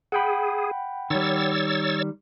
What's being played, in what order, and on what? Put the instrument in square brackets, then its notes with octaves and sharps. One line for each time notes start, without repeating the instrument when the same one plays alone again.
[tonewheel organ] G#4 [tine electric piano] F#5 G5 B5
[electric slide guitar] D#3 G3 [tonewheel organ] C#5 E6 A6